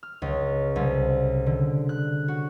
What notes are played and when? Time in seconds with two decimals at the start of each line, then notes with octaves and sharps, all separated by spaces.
0.03 F6
0.22 C#2
0.76 C2
1.46 D3
1.89 F#6
2.28 F#4